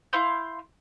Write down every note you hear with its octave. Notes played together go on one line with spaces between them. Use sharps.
E4 F5 C6 G6